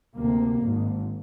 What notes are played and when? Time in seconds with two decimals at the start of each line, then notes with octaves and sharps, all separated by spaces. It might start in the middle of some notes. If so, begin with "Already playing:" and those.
0.16 D2 C3 A#3
0.63 G#1 G#2